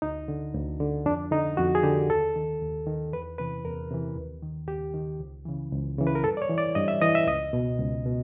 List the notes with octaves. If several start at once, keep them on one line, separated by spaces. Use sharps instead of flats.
D2 D#4
D3
D2
D3
F2 D4
D3 D#4
F2 F#4
G#4
D3 G4
D#2 A4
D#3
D#2
D#3
E2 B4
C3 E3 B4
E2 A#4
C3 E3
D#2
D#3
D#2 G4
D#3
C#2
C#3 E3
C#2
C#3 E3
B4
A#4
G2 A4
D5
C#5
E3
D5
G2 D#5
E5
E3 D#5
E5
C#2 D#5
B2
C#2
B2